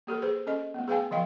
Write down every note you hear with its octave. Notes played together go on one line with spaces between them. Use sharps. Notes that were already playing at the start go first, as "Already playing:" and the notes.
A#3 G4 A4 A#4
G#4 B4 C5
C#4 A4 D#5
A3 B3
G#4 B4 F5 G5 G#5
D#3 F3 D#5 F5 G5